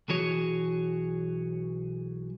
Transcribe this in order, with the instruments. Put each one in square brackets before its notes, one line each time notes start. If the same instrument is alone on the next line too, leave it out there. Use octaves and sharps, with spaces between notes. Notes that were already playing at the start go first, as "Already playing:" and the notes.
[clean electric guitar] B1 B2 E3 F#4 G#4 C#5